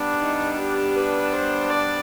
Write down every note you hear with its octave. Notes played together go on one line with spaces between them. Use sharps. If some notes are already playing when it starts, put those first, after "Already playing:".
Already playing: G3 B3 D4
D#4
G4
B4
C5
D5